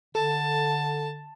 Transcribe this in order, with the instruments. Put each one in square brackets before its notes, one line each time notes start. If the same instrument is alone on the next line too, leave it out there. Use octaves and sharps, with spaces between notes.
[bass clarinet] D3 [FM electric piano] A4 [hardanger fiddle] A5